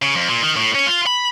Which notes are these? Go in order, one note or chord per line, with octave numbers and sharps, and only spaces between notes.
C#3
F2
A#2
D#3
A2
C#4
F4
B5